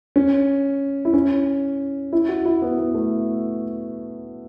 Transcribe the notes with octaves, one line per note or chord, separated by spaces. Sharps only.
C#4
E4
C#4
E4
F#4
E4
B3
B3
A3